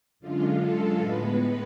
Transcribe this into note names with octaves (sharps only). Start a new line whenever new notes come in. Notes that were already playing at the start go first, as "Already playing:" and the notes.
F#2 D3 G#3 F4
A4
A2 G#3 B3 B4